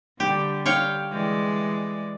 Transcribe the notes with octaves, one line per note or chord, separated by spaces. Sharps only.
D3 G3 G4
C#5 F5 G5
E3 G#3 D5